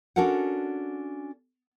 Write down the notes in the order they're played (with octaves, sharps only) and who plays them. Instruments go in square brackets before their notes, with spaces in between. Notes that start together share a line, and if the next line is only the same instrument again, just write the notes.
[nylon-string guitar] C#4 D4 F#4 A4 A#4 F#5